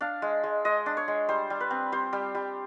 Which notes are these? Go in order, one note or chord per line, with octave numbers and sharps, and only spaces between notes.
D4 F5
G#3
G#3
G#3 D#5
D4
C#5
G#3
G3 C5
G3
B4
C4
G3 C5
G3
G3